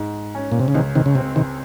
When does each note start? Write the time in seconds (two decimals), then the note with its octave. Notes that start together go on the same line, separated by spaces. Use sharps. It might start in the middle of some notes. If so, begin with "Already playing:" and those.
Already playing: G#2
0.35 C#4
0.52 A#2
0.59 C3
0.68 C#3
0.74 C#2 C3 D#3
0.95 C3 D#3
1.06 C#3
1.15 C3 C4
1.36 C3 D#3